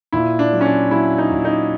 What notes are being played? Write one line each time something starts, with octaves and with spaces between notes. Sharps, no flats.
A#2 E4
D4
F#3
C#4
D4
F#3 E4
D#4
A#2
D#4